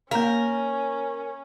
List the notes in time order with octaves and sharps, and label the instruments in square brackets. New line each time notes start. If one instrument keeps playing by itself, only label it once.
[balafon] A#3 F5 [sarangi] C#4 [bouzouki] A#4